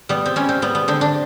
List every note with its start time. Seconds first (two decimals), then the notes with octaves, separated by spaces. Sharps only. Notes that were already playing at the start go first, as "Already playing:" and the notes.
0.09 G3 B3
0.26 C4
0.36 G3 C#4
0.49 C4
0.62 G3 B3
0.75 B3
0.88 D3 C4
1.01 D4